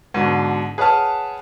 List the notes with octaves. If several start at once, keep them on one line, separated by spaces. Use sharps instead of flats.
G#2 B2 D3
G#4 B4 C#5 F#5 A5 F6